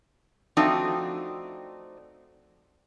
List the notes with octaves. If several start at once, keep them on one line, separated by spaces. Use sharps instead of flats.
F3 A3 C4 D4 D#4 F#4